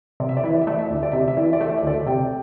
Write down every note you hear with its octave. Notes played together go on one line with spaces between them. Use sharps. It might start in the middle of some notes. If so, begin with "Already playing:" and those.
C3 D5
E5
D5
E3 E5
D5
E5
A3 D5
E5
D5
D2 E5
D5
C3 E5
D5
E5
E3 D5
E5
D5
A3 E5
D5
E5
D2 A4 D5
C3 D5 G5